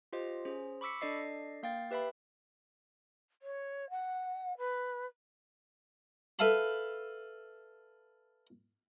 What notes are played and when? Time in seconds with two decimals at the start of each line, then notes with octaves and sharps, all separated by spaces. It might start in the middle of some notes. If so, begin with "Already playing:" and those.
0.13 F4 G4 C5 D#5
0.45 C#4 G#4 C5
0.81 B5 C#6 D6 E6 B6 C#7
1.01 D4 A4 D5 D#5 C7
1.63 A#3 F5 G5 A6
1.91 G4 B4 E5 G5 B5
3.42 C#5
3.90 F#5
4.58 B4
6.39 A4 B4 E5 F5 A5 B5